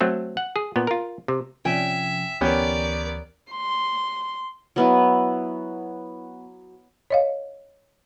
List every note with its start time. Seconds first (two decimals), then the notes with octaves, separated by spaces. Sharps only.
0.01 F#3 A3 C4
0.37 F#5
0.56 G#4
0.76 A#2 B3
0.87 F4 A#4
1.28 C3
1.65 C3 F3 C#4 E5 G5 G#5
2.41 D2 E3 B3 C#4 G4 A#4 D5
3.52 C6
4.76 F#3 B3 E4
7.10 C#5 D#5 F5